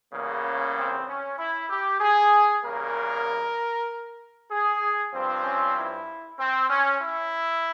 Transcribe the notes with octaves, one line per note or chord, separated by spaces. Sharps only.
E2 C#3 G3 A#3
C#4
C4
C#4
E4
G4
G#4
E2 C#3 G3 A#3 A#4
G#4
G2 F3 C4
C#4
E4
C4
C#4
E4